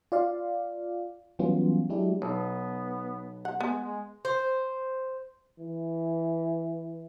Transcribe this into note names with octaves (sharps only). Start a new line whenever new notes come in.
F4 D5 F5
E3 F#3 G3 B3 C#4 F4
F#3 G#3 D4 E4 G4
B1 B3
F#5
G#3 B3
G#3
C5
E3